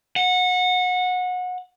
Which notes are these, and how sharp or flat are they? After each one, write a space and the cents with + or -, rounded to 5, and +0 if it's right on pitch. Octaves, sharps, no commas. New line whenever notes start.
F#5 -25